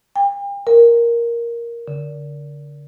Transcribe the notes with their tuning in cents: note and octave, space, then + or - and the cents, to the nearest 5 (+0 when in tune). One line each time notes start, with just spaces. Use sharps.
G5 +40
A#4 +5
D3 -25